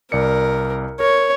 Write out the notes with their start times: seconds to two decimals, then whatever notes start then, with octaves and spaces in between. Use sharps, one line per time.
0.12 C2 A#4 D5 C#7
1.00 A#4 C#5